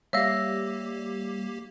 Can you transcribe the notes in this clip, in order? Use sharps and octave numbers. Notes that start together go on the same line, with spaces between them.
G3 A#3 G4 C#5 E5 F5 E6 A#6